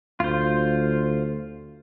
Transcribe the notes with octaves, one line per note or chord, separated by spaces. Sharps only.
D2 F4 C5